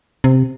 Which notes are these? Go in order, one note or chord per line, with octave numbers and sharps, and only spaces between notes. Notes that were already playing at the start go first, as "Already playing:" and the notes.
C3